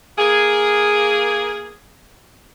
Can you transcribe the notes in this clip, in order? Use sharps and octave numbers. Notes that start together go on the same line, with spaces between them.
A#3 G#4